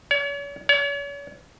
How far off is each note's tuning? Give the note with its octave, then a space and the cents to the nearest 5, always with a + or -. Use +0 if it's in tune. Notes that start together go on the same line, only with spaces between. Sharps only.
C#5 +40
C#5 +40